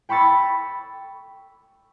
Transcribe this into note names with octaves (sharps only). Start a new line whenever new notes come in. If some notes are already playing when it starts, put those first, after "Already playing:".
G5 B5 C#6 E6 A6